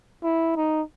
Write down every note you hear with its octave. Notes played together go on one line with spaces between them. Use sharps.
E4
D#4